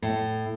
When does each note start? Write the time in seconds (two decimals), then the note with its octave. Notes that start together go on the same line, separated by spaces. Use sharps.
0.02 A2